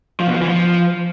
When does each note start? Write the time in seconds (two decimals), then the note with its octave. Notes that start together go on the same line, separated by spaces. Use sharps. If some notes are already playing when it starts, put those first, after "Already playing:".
0.20 F3
0.27 B2
0.34 F3
0.42 E3
0.49 F3